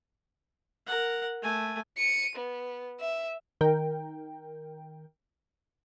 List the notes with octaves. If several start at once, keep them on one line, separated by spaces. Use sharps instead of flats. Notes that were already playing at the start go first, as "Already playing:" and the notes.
A#4 F#5
A3 G#5
C#7 D#7
B3
E5
D#3 A#4 G5